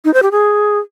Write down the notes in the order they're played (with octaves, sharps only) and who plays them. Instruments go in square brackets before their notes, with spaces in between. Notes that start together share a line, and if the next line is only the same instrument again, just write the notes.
[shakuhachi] D#4
C5
G4
G#4